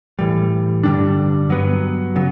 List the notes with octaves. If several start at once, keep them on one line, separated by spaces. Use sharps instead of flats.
A2 E3 G3
G2 D3 G3 D4
G2 F#3 B3
C#3 F#3